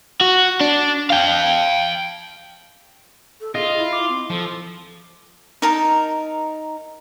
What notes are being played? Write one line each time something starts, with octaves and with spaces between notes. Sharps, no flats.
F#4
D4
F5 G5
A4
F4 G#4 D#5
E4
D6
C4
F3 A4
D#4 A#4 A5